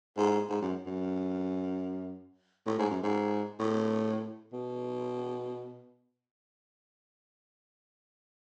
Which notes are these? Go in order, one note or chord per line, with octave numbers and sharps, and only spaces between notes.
G#2
G#2
F#2
F#2
A2
G#2
F#2
G#2
A2
B2